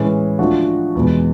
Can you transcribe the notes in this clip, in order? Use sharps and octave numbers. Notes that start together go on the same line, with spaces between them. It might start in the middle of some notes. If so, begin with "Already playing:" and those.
Already playing: A2 E3 G#3 C#4
F3 A3 D4 F#4
E2 B2 G#3